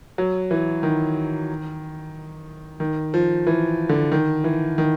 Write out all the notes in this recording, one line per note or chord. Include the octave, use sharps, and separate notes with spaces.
F#3
E3
D#3
D#3
F3
E3
D3
D#3
E3
D#3